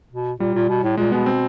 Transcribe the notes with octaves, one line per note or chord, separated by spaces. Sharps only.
B2
A#2 G3
A#2
B2
A2
A#2 G#3
B2 B3
C4